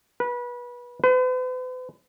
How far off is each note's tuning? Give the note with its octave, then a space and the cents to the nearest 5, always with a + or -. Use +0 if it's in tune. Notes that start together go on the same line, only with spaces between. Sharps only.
B4 -25
B4 +45